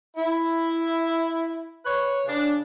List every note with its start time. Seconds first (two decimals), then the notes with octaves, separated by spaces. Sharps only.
0.17 E4
1.86 B4 C#5
2.27 C#3 D4